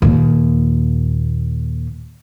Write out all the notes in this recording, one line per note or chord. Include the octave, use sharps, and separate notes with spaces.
D#2 A#2